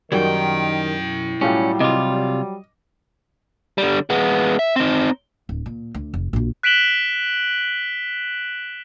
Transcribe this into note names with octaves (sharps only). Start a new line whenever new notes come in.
C#2 F#2 D#3 G3 E4 F#4 G5
A2 F#3 G3 C#4 F4 G4
C3 F4 D#5 D6
D3 G3
G#3 B3
E5
C4 D#4
D1
A#2
D2
F1
A#1 F#2
F#6 B6 D7 E7 F#7 G7